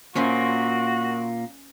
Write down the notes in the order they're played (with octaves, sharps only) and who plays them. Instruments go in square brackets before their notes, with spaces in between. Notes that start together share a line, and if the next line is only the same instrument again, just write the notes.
[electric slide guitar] A#2 A#3 [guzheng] C#4 C5 E5 [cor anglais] F#4